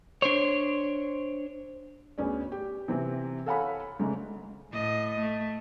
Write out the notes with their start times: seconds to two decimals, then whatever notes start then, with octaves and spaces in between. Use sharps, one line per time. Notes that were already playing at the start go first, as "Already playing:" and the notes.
0.22 D4 C5 C#5
2.18 D2 B3 C#4 G#4 D5
2.52 G4
2.88 C3 E3 C4
3.46 A4 C#5 F5 F#5 G#5 B5
3.99 G#1 G#2 C#3 A3
4.72 A2 D#5
5.20 A3